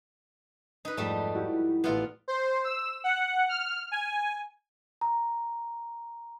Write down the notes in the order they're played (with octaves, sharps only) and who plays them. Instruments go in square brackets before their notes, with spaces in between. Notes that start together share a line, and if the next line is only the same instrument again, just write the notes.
[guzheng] D#4 B4
[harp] F2 G#2 [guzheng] G3 A3
[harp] E4 F#4 G4
[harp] A1 E5 G#6 [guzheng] B3 F4 D5
[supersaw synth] C5
E6
F#5
F6
G#5
[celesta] A#5